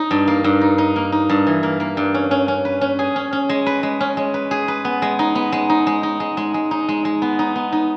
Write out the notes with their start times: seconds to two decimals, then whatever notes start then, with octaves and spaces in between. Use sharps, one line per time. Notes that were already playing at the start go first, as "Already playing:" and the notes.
Already playing: D#4
0.11 G2
0.28 A#3
0.44 G2
0.61 D#4
0.78 D#4
0.96 A#3
1.12 D#4
1.29 G2
1.47 E3
1.63 A#3
1.80 A#3
1.97 G2
2.14 C#4
2.31 C#4
2.48 C#4
2.65 B4
2.81 C#4
2.99 G#4
3.16 C#4
3.33 C#4
3.49 G#3
3.66 B4
3.83 G#3
4.01 C#4
4.17 G#3
4.34 B4
4.51 G#4
4.68 B4
4.85 B3
5.02 G#3
5.19 D#4
5.35 B3
5.52 G#3
5.70 D#4
5.87 G#3
6.03 D#4
6.20 G#3
6.37 G#3
6.54 G#3
6.71 D#4
6.89 G#3
7.05 G#3
7.22 B3
7.39 D#4
7.56 B3
7.72 D#4